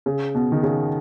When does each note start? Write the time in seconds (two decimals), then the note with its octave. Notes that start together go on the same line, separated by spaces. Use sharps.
0.06 C#3
0.35 B2
0.52 D#3
0.63 C#3